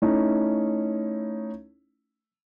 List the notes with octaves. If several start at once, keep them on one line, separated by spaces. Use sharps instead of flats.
A3 C#4 D#4 E4